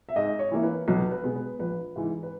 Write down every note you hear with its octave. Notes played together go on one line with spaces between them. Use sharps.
E5
G#2 D#5
C#5
E3 A#3 E4
B4
B1 B4
B4
B2 G#3 B3
B4
A#1 B4
G#2 E3
B4